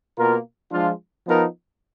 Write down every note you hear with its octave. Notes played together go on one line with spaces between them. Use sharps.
B2 A#3 F4 A#4
F3 G#3 D4 F4
F3 B3 D#4 A#4